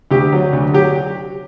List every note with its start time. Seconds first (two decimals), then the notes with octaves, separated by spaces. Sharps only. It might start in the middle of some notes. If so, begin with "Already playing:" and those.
0.11 D2 G4
0.32 F#3
0.53 D2
0.74 F#3 G4